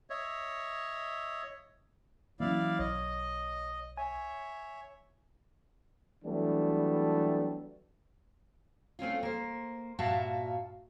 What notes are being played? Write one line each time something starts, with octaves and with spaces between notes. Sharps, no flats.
C#5 D#5 E5
E3 F#3 A#3 C#4 E4 D5 F5
B1 C#5 D#5
C#5 E5 G#5
E3 F#3 G3 A3 B3 D4
A3 C4 C#4 F4
A#3 C5
G2 A#2 F#4 E5 F5 A5